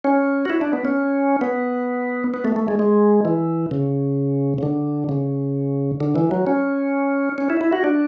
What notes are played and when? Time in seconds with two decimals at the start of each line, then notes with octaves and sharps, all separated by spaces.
0.04 C#4
0.45 F#4
0.50 E4
0.61 D4
0.73 B3
0.85 C#4
1.41 B3
2.34 B3
2.45 A3
2.56 A3
2.68 G#3
2.79 G#3
3.25 E3
3.71 C#3
4.58 C#3
4.63 D3
5.09 C#3
6.01 D3
6.16 E3
6.31 F#3
6.47 C#4
7.38 C#4
7.50 E4
7.61 E4
7.73 F#4
7.84 D4